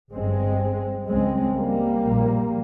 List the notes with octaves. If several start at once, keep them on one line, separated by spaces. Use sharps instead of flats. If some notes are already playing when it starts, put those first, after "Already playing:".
G1 G2 G#3 C4
C#2 C#3 G#3 C4
G3 A#3
A#1 A#2